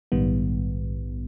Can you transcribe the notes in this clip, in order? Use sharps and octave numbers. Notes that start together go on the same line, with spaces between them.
A#1 G#2 D#3 G3 B3